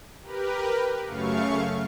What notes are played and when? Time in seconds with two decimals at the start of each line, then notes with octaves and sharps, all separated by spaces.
0.23 G4 A#4 B4
1.06 F#2 C#3 A3 F5 C#6